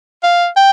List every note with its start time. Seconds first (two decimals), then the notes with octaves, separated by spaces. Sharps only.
0.24 F5
0.57 G5